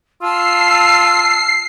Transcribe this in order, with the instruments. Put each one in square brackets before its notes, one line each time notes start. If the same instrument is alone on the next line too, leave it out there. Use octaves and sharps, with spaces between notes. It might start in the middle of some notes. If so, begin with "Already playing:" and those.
[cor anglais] F4 [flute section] A5 E6 F6 [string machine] C7